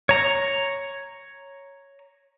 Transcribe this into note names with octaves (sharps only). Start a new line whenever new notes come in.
C#5 A#5